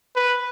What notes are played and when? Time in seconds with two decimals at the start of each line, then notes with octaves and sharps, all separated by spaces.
0.16 B4